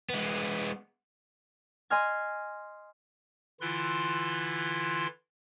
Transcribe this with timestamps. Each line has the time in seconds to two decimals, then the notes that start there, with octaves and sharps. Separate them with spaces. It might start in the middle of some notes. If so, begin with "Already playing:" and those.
0.10 G#3 B3
1.90 D#5 G#5 C6 F6 G#6
3.61 D3 E3 E4 F4 C6 F#6